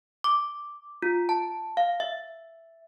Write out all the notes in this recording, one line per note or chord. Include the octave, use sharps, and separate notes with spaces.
D6
F4
A5
F5
E5